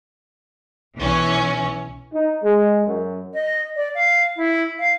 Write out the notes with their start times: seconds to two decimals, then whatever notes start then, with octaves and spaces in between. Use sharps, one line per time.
0.97 B1 E3 C#4
2.14 D#4
2.44 G#3
2.87 F#2
3.34 D#5
3.76 D5
3.95 F5
4.37 E4
4.79 F5